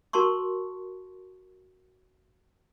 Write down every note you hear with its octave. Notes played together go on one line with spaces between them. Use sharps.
F#4 A#4 A5 C6 C#6